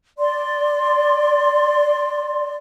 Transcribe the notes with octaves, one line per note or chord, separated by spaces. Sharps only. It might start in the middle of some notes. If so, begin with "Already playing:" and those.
D5 C6